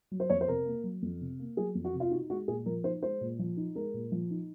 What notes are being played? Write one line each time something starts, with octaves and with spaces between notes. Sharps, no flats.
F#3
C5
F2 C#5
C5
C3 A#4
A#3
F#3
F2
C3
A#3
F#3 G#4
F2
F#4
C3
F4
D#4 F#4
G#3 F#4
A#2 G#4
F3 A#4
D#4 C5
G#3 C5
A#2
F3
D#4
G#3 A#4
A#2
F3
D#4